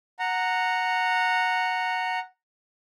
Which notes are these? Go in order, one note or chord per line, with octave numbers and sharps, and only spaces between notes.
F#5 A#5